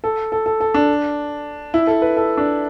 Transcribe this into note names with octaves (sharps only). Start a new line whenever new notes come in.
A4
A4
A4
A4
D4
E4
A4
B4
A4
D4